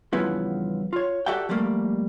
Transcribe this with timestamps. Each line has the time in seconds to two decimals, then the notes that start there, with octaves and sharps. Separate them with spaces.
0.13 E2 G2 C#3 F3 B3 E4
0.93 F4 C#5
1.26 F#4 G4 A4 D5 E5 G5
1.49 F3 G3 A3 A#3